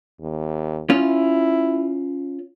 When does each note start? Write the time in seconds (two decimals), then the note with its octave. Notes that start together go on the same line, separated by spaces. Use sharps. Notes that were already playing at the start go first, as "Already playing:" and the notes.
0.20 D#2
0.90 C#4 E4 F4